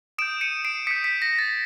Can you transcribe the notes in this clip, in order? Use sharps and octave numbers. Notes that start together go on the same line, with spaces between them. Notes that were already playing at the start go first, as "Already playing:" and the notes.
D#6 G6 D7 E7
C#7 D#7
C7 D7
D#6 G6 B6 C#7
B6
A#6
A6